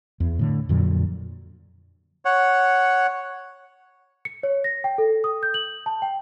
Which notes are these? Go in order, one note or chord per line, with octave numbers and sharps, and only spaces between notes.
E2
A2 D3
F2 A#2 D3 F#3
C#5 F#5
C#7
C#5
A#6
G5
A4
D#6
G6
F#7
A5
G5